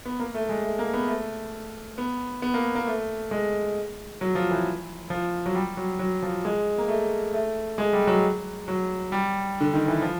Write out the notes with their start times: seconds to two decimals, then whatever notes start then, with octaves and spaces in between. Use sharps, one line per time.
0.05 B3
0.20 A#3
0.34 A3
0.49 G#3
0.63 A3
0.79 A#3
0.93 B3
1.08 A3
1.98 B3
2.42 B3
2.54 A#3
2.75 A#3
2.87 A3
3.31 G#3
4.21 F#3
4.35 F3
4.51 E3
5.10 F3
5.46 F#3
5.55 G3
5.77 F#3
5.99 F#3
6.22 F3
6.45 G#3
6.78 A#3
6.88 A3
7.33 A3
7.78 G#3
7.93 G3
8.07 F#3
8.68 F#3
9.12 G3
9.61 D3
9.74 D#3
9.88 E3
10.02 F3